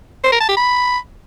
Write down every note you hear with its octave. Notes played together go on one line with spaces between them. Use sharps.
C5
A#4
A5
G4
B5